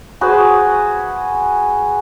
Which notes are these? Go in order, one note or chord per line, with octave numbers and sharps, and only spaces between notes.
F#4 G#4 B4 C5